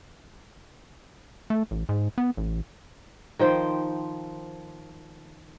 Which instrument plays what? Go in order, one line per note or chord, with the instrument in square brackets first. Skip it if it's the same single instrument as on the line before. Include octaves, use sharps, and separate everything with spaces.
[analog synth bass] A3
A1
G#2
B3
A1
[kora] D#3 F3 C5 G5